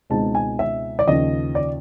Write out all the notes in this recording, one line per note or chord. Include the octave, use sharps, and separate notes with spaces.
C#2 B2 G#3 C4 D#4 A5
G#5
E5
D5
D#2 C#3 F3 D#5
D5